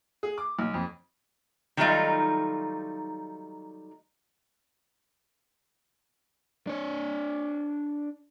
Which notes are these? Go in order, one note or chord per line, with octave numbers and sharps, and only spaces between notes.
G#4
D6
B1
F2
D#3 F#3 G3 A3 D#4 F4
D4 C#5